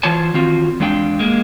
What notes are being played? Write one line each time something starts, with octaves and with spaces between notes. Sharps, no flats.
E3 F4 C5 C#5 A5
D#3 C4 F4 F#4
E2 G#3 D4 F5 G5
G#3 A#3